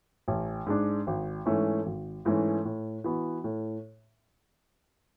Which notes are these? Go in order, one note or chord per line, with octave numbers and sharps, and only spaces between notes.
A1
G#2 G#3 D4
G#1
G#2 E3 A3 C#4
G#1
G#2 E3 A3 C#4
A2
E3 B3 F#4
A2